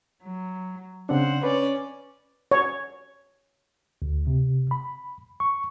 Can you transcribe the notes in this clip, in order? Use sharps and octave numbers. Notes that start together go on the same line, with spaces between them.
F#3
C#3 C4 D4 C5 F#5
C#4 B4 D5
C#5
D2
C3
B5
C#6